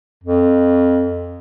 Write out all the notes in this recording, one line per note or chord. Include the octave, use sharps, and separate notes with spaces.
F2